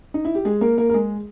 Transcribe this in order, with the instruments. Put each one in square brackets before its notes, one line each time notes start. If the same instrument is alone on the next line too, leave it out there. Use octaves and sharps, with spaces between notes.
[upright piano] D#4
E4
G4
G#3 G#4
A#3 A#4
A#3 A#4
A#4
G#3 G#4